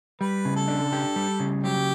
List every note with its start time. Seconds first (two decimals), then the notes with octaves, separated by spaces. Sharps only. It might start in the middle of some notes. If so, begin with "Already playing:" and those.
0.21 G3 B4
0.45 C#3
0.56 A4
0.68 D4
0.93 G4
1.16 G3
1.40 C#3
1.63 F#3 G4